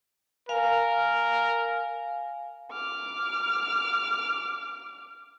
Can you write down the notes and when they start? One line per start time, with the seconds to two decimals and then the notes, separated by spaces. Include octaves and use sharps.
0.49 A#4 F5 G#5
2.72 D6 F6